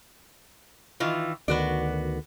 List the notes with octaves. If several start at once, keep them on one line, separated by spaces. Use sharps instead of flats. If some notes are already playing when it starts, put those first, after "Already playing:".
D#3 E3 F4
D2 D#3 B3 F#4 D5